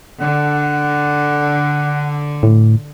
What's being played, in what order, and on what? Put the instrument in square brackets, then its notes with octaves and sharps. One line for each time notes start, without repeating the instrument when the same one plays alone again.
[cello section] D3 [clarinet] F#5
[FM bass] A2